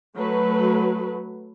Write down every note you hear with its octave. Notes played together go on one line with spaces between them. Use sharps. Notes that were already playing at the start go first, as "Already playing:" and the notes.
F#3 A3 B4